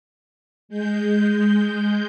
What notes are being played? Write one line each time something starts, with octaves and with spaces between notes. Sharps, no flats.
G#3 G6